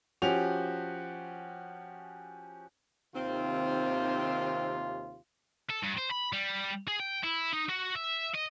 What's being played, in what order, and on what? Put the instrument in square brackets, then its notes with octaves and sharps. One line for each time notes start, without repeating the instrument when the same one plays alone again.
[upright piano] F3 C#4 F#4 G4 F7
[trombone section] D#2 C3 F4 [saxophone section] D#3 C4
[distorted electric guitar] A4
G2
C5
B5
G3
G#4
G5
E4
D#4
F#4
E5
D#5